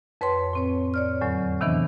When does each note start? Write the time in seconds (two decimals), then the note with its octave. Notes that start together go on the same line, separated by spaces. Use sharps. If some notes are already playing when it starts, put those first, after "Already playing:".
0.21 F2 B4 C#5 G5 C6
0.53 A2 C4 C#5
0.94 C#5 D5 F6
1.21 E2 A2 D3 F#3
1.61 C3 D#3 E3 B3 D4